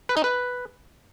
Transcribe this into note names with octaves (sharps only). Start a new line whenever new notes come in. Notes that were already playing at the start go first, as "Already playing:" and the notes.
B4
D#4
B4